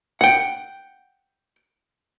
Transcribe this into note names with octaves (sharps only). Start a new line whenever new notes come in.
F#5 G5